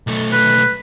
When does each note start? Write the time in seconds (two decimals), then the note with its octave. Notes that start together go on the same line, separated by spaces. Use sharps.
0.07 B1 A3
0.33 B4